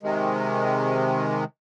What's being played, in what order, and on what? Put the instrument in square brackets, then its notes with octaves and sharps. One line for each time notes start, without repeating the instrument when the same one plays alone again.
[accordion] C3 D#3 G#3